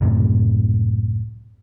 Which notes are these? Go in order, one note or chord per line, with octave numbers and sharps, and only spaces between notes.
C#2 F#2 A2 C3